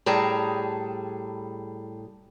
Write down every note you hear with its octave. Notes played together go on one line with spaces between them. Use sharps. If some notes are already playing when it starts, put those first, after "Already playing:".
A2 G3 G#4 A5 A#5